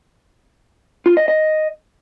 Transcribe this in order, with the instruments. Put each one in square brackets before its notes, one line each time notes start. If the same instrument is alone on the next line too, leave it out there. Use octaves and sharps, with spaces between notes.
[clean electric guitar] F4
D#5
D#5